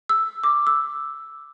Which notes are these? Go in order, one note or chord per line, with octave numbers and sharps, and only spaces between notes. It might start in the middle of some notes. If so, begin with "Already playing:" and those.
E6
D6
E6